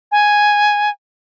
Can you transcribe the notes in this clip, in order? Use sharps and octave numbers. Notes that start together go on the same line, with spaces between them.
G#5